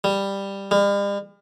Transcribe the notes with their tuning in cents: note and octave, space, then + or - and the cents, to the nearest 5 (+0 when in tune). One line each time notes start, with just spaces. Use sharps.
G3 +10
G3 +45